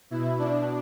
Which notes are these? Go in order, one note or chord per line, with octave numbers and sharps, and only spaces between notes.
B2 E4
B2 D4